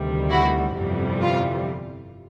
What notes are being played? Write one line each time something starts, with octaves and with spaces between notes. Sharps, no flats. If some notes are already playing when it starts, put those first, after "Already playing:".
Already playing: D2 C3 D#3 G3
E4 F#4
G1 F2 C3 E3 G3
F4